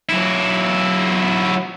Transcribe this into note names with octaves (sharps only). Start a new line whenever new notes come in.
F#3 E4